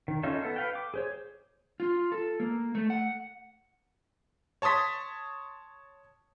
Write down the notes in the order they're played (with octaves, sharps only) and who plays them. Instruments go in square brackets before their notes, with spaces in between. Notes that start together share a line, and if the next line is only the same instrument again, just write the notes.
[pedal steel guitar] D#3
C#4 D#4 F4 A4 E5
B3 A4
B4 F5 G5
D6
G#4 C5 C#5
[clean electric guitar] F4
A4
A#3
A3
F#5
[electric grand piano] C#5 A5 C6 D#6 B6